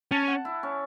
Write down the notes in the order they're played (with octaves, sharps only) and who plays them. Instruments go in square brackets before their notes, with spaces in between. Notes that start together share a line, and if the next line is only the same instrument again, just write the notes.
[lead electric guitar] C#4 [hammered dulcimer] A5
[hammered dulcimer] F#5
E4
C#4